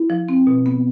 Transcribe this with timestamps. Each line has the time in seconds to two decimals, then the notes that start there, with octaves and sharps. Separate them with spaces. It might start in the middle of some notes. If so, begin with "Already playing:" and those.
Already playing: E4
0.10 F3
0.29 C4
0.47 B2
0.66 B3